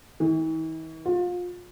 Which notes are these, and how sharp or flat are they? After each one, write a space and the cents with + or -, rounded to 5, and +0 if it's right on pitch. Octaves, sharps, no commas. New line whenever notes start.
E3 -45
F4 +30